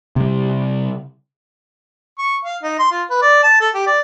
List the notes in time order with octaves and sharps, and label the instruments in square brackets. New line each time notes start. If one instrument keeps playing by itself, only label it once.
[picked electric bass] C3 G3
[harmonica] C#6
F5
D#4
C6
F4
B4
D5
A5
A4
G4
D5